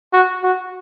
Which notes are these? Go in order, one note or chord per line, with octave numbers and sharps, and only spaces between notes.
F#4
F#4